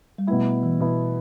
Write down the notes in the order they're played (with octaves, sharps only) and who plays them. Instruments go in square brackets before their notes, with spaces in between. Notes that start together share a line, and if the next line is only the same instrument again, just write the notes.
[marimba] G3
[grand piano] B2 B3 E4 [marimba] A3
[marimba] E3
[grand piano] B2 B3 E4